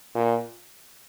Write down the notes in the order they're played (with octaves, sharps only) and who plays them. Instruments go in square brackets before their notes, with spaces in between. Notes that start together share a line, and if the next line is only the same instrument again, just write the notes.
[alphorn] A#2